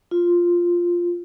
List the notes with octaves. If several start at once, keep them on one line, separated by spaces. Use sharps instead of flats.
F4